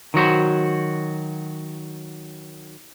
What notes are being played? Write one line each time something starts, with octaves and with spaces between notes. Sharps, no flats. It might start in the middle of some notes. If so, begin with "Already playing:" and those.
D#3 F#3 F#4 C5